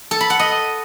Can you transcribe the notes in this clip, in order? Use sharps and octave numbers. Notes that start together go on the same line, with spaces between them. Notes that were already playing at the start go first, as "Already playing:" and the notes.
A4
B5
F#5
D#5